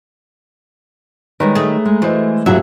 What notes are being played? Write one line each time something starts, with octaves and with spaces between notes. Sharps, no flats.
D#3 G3 G#3 B4 C#5 A#5
A3 G#4
G#3
E3 A3 F#4 C5 D#5
D#1 F#3 E4 F#4 G#4 E5